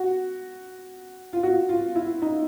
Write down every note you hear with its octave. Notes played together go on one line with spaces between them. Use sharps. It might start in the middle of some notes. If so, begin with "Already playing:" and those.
Already playing: F#4
F4
F#4
F4
E4
D#4